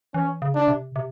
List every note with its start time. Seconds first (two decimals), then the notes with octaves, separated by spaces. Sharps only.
0.14 E3 C#4
0.42 C#3
0.55 D4
0.68 C3
0.96 C3